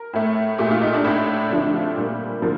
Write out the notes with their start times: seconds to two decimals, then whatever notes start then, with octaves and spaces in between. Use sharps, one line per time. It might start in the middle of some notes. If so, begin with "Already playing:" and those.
Already playing: A#4
0.13 A2 A3
0.58 A#2 A3 G4
0.71 F4
0.81 D#4
0.94 D4
1.04 A2 A3
1.50 D3 F3 A3 C4
1.62 D4
1.74 F4
1.96 A#2 G3 A#3
2.42 D3 F3 A#3 A#4